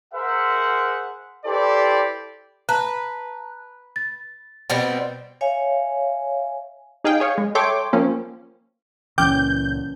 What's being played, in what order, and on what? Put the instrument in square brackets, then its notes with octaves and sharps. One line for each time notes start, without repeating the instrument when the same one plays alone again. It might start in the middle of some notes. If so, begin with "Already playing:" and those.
[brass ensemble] G#4 A#4 C5 E5 F#5
E4 G4 A4 B4 C5 D5
[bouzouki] B4 [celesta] A5 A#5 F#6
[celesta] A6
[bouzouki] B2 G3 C4
[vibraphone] C#5 E5 F5 G#5
[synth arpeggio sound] D#4 G#4 F5 G5
G#4 C#5 F5
G#3
A4 C#5 E5 G5 C6 D6
F3 A#3 C4 C#4
[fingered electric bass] C#2 A#2 [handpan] E3 C#4 [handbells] G5 D6 F6 [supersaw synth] G6